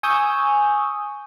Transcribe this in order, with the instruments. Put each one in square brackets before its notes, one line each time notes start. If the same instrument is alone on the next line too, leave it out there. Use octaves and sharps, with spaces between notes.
[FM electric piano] G#5 C#6 D#6 E6 G6